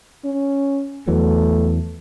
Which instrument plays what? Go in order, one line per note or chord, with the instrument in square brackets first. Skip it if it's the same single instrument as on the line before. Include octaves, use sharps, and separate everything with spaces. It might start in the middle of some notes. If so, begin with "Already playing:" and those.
[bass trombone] C#4
[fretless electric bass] E2 E3 F#3 [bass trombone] A3